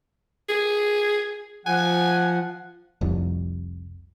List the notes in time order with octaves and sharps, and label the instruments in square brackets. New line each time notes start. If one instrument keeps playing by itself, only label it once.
[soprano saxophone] G#4
[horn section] F3 F#5 [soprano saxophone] G#5
[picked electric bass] F1 C2 F2